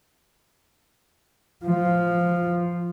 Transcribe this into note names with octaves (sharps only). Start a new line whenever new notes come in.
F3